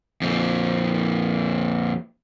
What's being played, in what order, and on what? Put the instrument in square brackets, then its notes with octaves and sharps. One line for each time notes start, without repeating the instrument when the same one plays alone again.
[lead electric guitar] F2 A#2